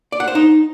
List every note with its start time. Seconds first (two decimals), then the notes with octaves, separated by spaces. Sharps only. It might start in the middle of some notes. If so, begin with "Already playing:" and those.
0.12 D5
0.20 F#5
0.28 C5
0.35 D#4